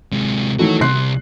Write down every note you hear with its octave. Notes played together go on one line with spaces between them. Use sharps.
C3 G#3
D#3 E3 A3 F#4 C#5
C2 C6 F#6 C7